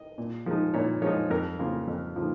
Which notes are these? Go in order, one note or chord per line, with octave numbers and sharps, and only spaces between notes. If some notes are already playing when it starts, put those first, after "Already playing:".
Already playing: D#5
A#2
F3 G#3 D#4
A#2 C#5
F3 G#3 D#4 C#5
F2 A#4
C#3 F3 A#3 F4
F2
C#3 F3 A#3 F4